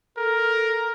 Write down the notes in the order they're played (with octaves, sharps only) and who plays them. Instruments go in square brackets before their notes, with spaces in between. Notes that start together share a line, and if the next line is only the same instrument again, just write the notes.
[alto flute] A4 [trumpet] A#4